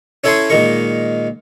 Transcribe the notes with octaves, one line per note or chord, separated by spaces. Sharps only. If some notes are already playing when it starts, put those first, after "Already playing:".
C#4 E4 A4 C#5 G#5 C6
A#2 D#3 G#3 A#4 C#6